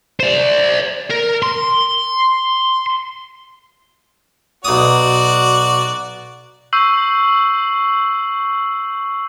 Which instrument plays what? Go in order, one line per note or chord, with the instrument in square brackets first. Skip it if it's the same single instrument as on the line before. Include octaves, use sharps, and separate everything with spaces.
[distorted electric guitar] C5 D5
A#4
C6
[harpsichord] B1 D#6 [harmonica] F#4 D5
[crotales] C#6 E6 G6 C7 F#7